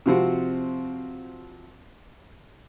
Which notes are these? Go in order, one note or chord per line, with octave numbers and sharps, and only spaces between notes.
C3 F3 C4 F#4